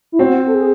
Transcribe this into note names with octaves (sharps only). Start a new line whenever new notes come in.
E4
C4 F#4
A4
G#4